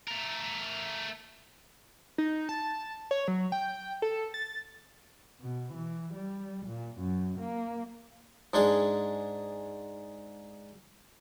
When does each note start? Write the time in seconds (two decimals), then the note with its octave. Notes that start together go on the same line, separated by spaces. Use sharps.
0.08 A3 A#4
2.18 D#4
2.49 A5
3.11 C#5
3.28 F#3
3.52 G5
4.02 A4
4.34 A6
5.41 B2
5.73 E3
6.14 G3
6.66 A#2
6.98 F#2
7.40 A#3
8.54 G#2 G#3 D4 G#4